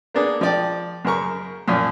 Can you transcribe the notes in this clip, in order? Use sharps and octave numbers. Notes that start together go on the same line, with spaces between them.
A#3 B3 D4 G#4
F3 D5 G5
F#2 C#3 A#4 C#6
F#2 A#2 F3